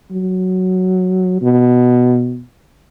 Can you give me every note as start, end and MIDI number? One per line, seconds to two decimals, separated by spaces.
0.11 1.37 54
1.41 2.41 47